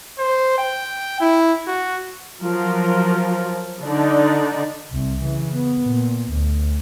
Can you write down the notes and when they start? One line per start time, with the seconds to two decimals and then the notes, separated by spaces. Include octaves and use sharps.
0.19 C5
0.58 G5
1.21 E4
1.67 F#4
2.43 F3 F#3 A#4
3.82 D3 D4 D#4 D5
4.91 C2 C3
5.20 C#3 E3
5.54 B3
5.83 A#2
6.32 D2